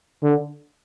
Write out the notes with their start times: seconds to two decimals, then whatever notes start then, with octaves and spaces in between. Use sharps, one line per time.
0.23 D3